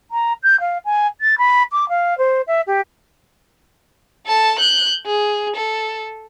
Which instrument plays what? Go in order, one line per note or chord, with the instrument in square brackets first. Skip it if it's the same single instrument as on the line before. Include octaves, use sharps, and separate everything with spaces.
[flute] A#5
G6
F5
G#5
A6
B5
D6
F5
C5
E5
G4
[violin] A4 A5
F#6 G6
G#4
A4